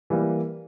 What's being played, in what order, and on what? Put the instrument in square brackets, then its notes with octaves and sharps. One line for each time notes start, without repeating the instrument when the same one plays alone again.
[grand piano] E3 G3 A#3